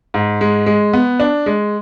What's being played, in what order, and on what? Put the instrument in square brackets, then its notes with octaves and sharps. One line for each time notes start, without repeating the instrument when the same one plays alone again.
[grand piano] G#2
G#3
G#3
B3
D4
G#3